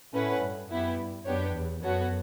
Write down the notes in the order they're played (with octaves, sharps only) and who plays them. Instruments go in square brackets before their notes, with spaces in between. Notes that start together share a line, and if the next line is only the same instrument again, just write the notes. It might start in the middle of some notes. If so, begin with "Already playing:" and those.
[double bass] A2 [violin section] A3 C#4 E4 B4 F#5
[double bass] G2
[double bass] F#2 [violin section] B3 E4 G4
[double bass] G2
[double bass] F#2 [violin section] B3 D4 G4 C#5
[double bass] E2
[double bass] F#2 [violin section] B3 F#4 A4 C#5 F#5